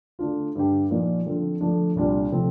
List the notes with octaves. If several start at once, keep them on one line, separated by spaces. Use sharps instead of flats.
D3 A3 D4 F4
G2 D3 G3 D4 G4
A#2 F3 A#3 D#4
D3 F3 C4 F4 A4
D3 F3 A3 D4
C2 A#2 G3 D4 F4
C3 F3 A3 C4